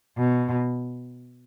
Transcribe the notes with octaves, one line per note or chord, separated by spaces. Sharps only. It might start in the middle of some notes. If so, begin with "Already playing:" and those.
B2